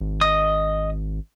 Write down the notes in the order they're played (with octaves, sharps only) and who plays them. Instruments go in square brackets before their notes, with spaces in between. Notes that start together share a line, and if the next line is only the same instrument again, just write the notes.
[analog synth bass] G#1
[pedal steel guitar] D#5 D#6